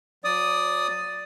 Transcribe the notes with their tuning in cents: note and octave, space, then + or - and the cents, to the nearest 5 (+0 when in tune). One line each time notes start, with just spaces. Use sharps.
F#3 -35 D5 +0 D#6 +0